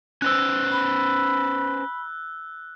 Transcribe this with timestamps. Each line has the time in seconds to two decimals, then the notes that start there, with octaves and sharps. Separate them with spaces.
0.22 C#4 B4 C5 E6 F#6
0.72 B5